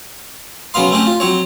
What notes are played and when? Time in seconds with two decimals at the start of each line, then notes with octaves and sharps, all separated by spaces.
0.74 C#3 F#3 B3 F5 C6
0.91 A3 C4 C#4 G4
1.07 F4
1.20 F#3 C4 C#5